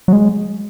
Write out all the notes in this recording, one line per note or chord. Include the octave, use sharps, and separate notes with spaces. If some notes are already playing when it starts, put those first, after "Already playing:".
F#3
G#3